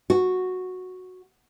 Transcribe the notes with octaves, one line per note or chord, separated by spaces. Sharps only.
F#4